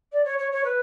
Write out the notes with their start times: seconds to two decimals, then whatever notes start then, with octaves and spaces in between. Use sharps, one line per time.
0.12 D5
0.25 C#5
0.39 C#5
0.52 C#5
0.65 B4